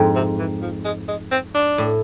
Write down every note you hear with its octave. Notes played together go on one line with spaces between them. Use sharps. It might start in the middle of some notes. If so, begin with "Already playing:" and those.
Already playing: F2 G#2
C3
E3
F3
G#3
G#3
C4
D4
A2